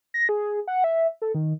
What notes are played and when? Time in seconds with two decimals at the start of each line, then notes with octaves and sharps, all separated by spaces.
0.14 A#6
0.29 G#4
0.68 F#5
0.84 E5
1.22 A4
1.35 D#3